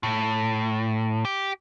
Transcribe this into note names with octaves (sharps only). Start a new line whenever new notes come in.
A2
G4